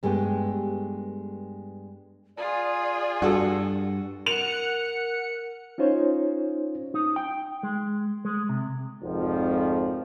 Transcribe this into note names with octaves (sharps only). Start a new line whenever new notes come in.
G2 G#3 A3 B3 G4
F4 G#4 D5
G2 F#4 A4
A#4 F#5 C#7 F7
C#4 D#4 F4 C5 C#5
D#4
G5
G#3
G#3
C3
G#1 F2 D#3 F3